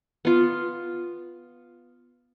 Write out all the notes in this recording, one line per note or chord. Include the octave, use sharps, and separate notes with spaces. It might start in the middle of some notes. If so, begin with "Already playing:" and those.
B3 F4